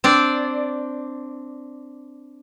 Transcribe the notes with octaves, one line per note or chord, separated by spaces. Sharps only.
C4 D4 D5